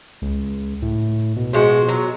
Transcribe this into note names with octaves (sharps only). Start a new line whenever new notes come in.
C#2
A2
B2
B2 F3 G#3 F#4
F#3